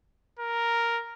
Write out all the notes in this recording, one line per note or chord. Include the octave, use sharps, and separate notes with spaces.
A#4